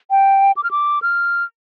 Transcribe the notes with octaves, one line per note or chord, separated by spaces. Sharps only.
G5
D6
F6
D6
F6